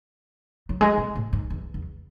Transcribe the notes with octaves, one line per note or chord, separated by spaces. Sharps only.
F#3
G#3
C3
A2
G#2
E2
E2